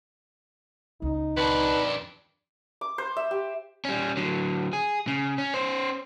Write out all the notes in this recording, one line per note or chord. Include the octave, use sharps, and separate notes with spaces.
C#2 D#4
F2 D4 B4
D6
C5
E5
G4
G3 C#4
D3 F#3
G#4
C#3
C#4
C#4 C5